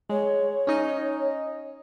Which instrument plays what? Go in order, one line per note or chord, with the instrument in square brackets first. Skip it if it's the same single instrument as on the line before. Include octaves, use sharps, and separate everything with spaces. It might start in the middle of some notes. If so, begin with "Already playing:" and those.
[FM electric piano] G#3 [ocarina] C#5
[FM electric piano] C#4 D#4 D#5